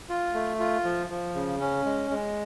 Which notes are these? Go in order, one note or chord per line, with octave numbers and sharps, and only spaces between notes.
F4
A3
F4
F3
F3
C#3
C#4
G#3
G#3